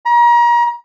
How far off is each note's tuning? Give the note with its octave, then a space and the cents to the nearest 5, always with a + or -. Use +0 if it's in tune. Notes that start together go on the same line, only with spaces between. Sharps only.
A#5 +35